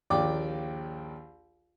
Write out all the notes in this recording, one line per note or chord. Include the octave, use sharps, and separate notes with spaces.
A#1 D#2 D5 G5 D6